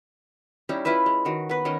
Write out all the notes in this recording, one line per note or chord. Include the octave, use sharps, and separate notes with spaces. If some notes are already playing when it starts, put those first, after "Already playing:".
G3 C#4 D#4 E4
E4 F4 B4 E5
G#3
D#3 F#4
B3 B4
D#3 C#4 D#5